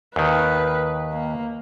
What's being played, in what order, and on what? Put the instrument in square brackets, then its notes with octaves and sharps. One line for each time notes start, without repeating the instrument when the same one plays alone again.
[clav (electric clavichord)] D#2 D#3 [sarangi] B4
[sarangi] A#3